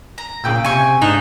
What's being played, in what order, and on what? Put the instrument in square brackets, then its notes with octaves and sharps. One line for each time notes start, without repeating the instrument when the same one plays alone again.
[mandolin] A#5
[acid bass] A#2 [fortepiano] C#3 G5 E6
[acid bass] C3 [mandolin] G#5 C#6
[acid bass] G#2 [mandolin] D4 [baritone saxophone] D#4